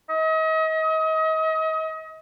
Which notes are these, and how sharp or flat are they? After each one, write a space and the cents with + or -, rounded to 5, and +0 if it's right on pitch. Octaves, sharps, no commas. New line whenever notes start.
D#5 +35